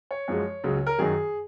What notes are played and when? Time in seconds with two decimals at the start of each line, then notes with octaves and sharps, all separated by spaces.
0.11 C#5
0.28 F#2 F3 G#3
0.64 C#2 C#3 F#3
0.87 A#4
0.98 F#2 D#3 F#3 G#4